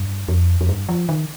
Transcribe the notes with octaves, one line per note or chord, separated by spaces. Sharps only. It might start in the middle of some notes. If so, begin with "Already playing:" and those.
Already playing: G2
F2
F2
G2
F3
D#3